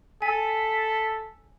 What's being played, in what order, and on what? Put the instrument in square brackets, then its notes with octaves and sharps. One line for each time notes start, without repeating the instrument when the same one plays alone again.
[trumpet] A4 [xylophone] G#5 [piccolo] B6